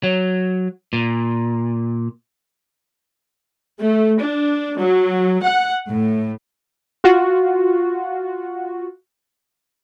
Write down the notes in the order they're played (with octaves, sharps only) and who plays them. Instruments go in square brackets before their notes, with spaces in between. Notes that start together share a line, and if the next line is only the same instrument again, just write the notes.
[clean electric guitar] F#3
A#2
[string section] A3
D4
F#3
F#5
A2
[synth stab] F4 F#4